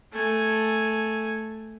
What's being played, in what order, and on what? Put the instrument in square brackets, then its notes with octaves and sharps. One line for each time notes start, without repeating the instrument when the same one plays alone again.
[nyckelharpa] A3 G#5